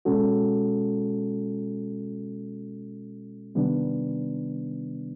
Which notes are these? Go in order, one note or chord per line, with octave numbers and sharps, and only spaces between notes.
B2 G#3 C#4 F#4 A4
C3 D#3 G3 B3 D4